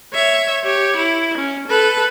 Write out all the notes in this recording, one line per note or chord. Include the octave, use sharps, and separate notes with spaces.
C#5 E5
G4 C#5
E4
C#4
A4 B4